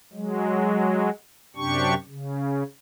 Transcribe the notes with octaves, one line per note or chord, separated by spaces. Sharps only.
F#3 G#3
F#2 C3 D4 G4 C#6
C#3